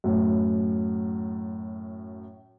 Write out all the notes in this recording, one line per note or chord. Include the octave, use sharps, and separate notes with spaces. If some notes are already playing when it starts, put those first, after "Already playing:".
F#2 A2